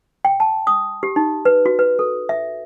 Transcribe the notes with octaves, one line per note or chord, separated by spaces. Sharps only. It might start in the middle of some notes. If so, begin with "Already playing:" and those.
G5
A5
D#6
G4
D#4
B4
F#4
B4
A4
E5